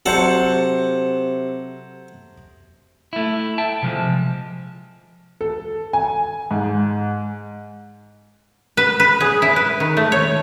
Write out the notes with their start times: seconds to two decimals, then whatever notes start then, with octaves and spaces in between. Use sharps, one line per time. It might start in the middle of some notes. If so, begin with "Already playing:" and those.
0.06 C3 F#3 A4 C5 F#5 A5 C#7
3.13 A3 E4
3.58 E5 G5 A5
3.82 C3 F3 G#3
5.41 A4
5.93 G#5
6.51 G#2
8.77 B4
9.00 B4
9.20 G#4
9.42 E4
9.56 B4
9.80 D#3
9.97 A3
10.12 C#5